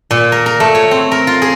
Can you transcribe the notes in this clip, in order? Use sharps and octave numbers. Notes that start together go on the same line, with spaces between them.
A#2
A#4
A#4
A3
C#5
C4
A#4
F4
G#4